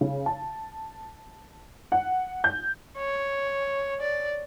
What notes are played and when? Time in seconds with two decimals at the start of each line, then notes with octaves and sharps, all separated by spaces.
0.01 C#3
0.26 A5
1.92 F#5
2.44 G6
2.98 C#5
4.01 D5